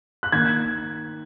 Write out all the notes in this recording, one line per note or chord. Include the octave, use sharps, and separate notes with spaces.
F#6
D#3 A#3 G#6